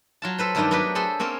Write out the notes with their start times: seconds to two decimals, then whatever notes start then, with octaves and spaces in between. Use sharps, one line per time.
0.22 F#3 F4 A5
0.38 A4 B4 C5
0.55 G2 D#3 A3 D4 D#4 D5
0.71 F#3 B3 D4 G4 B4
0.95 G#4 A4 C5 B5 C6
1.19 A#3 C4 C#4 A#4